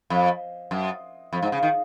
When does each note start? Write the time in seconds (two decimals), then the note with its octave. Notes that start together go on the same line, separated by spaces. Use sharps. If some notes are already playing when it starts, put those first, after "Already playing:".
0.10 F2
0.71 F#2
1.33 F2
1.42 G#2
1.52 C#3
1.63 D#3